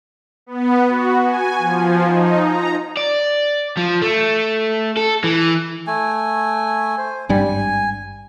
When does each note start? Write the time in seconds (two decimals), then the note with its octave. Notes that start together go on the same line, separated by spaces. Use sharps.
0.46 B3
0.88 F#4
1.23 G#5
1.58 F3
2.04 D#4
2.40 A#5
2.97 D5
3.77 F3
4.02 A3
4.97 A4
5.24 E3
5.87 A3 G#5
6.98 C5
7.29 G#1 G2 G3 G#5